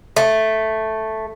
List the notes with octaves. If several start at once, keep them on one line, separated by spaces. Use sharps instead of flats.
A3